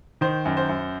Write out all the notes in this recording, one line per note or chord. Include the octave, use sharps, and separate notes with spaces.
D#3 C5
F#2
C5
F#2